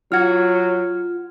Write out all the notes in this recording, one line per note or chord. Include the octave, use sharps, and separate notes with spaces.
F#3 F4 F#5 F6 G#6